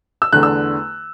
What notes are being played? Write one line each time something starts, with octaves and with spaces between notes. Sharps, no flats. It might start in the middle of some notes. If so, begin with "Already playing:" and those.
E6
E2 D3 A3 F#6
E6